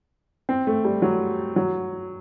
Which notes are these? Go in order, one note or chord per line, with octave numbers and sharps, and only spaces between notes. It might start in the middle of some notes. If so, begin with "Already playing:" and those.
C4
A3
G3
F#3
F#3